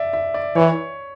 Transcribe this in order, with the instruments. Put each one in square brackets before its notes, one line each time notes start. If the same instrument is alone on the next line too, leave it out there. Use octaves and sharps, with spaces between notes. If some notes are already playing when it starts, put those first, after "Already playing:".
Already playing: [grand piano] D5 E5
E5
D5
[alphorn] E3 [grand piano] C#5